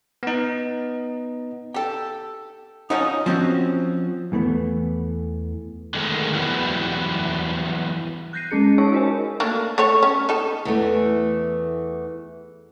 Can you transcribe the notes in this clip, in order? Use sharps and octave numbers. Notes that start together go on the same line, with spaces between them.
B3 D#4
G4 A4 G5
F3 F#3 C#4 D#4 D#6
F3 C4 C#4 F#4
E2 E3 A3 B3
D3 D#3 G#3 A3 G#4 A#4
E3 F#3 G3 B3
F#6 G6 A#6 C7 D#7
G#3 C#4 G#4 C#7
D#4 C#5 A5 C#6
D#4 F#4 A#4 C5 D#5 G#5
A3 A#3 D4
A3 A4 C#5
C#4
D#4 A4
E2 E3 A3